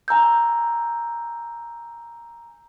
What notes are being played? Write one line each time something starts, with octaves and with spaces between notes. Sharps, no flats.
G#5 A#5 E6 G6